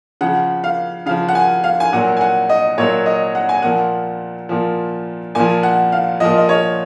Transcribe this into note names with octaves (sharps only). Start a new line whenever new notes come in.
C#3 F3 F#5
F5
C#3 F3 F5
F#5
G#5
F5
G#5
A#2 F#3 F#5
G#5
F#5
D#5
A#2 F#3 C#5
D#5
F#5
G#5
A#2 F3 F#5
A#2 F3
A#2 F3 G#5
F#5
F5
A#2 F3 D#5
D#5
C#5